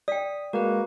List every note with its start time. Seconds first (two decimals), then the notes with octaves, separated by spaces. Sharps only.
0.08 D5 G5 D#6 B6
0.53 G#3 A#3 F#4 B4